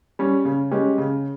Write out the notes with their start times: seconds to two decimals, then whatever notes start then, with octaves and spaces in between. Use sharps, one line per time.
0.19 G3 C#4
0.45 C#3
0.71 G#3 C#4 G4
0.98 C#3